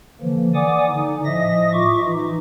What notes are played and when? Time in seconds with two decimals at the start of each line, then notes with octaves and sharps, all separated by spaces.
0.21 D3 E3 F3 A#3
0.55 D5 F#5 G#5 D6 D#6
0.87 D3 D#4
1.25 A2 F3 D#5 E5 D#6 A#6
1.73 F4 E5 C#6 D6
2.05 E3 D#4